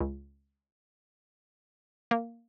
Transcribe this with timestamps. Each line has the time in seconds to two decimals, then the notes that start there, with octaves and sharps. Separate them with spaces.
0.01 C#2
2.11 A#3